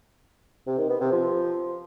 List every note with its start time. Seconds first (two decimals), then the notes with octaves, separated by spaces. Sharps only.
0.67 C3
0.78 D#3
0.89 B3
1.01 C3
1.12 F3